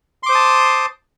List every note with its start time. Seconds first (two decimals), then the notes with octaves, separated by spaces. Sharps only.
0.23 C6
0.26 D6
0.29 C5
0.32 D#6
0.35 A5